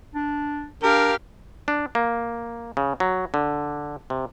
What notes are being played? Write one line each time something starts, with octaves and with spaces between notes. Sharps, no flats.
D4
D4 G4 A#4 F5
D4
A#3
C#3
F#3
D3
C3